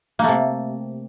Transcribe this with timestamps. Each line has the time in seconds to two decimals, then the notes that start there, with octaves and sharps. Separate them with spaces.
0.19 A#3
0.24 A3
0.28 C3